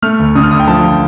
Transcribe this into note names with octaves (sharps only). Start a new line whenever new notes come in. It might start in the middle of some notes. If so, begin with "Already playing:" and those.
A3 F6
D2
D3 D#6
F6
D2 D#6
G5
F3 A5
F3